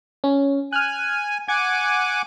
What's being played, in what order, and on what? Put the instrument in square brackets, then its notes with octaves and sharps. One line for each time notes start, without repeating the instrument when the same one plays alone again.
[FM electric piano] C#4
[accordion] G#5 [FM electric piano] F6 F#6
[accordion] F#5 G#5 D6 [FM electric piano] G#6